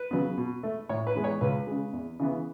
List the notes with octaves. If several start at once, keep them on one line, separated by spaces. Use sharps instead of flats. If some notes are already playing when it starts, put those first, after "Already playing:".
Already playing: B4
C#3 F#3 B3
B2
A3
A2 C#5
B4
E3 G#3 B3
C#5
C#2 B4
C#3 G#3
E2
C#3 E3 B3